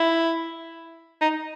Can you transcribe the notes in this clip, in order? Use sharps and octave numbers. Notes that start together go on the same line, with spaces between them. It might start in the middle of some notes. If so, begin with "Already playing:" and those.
Already playing: E4
D#4